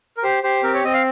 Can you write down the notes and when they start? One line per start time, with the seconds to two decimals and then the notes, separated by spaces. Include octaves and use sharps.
0.17 A#4
0.23 G4 C5
0.43 G4 C5
0.63 C4 A#4
0.74 C#5
0.84 C4 D#5
0.93 F5